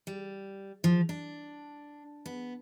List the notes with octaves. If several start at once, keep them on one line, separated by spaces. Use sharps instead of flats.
G3
F3
D4
B3